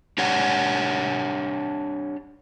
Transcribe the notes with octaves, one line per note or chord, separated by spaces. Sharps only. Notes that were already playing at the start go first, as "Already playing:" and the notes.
D4 G4 C#5 F#5